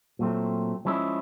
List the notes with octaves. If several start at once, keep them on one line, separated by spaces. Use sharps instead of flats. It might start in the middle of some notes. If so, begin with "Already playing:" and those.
A#2 F#3 A3 C4
F3 G#3 C#4 E4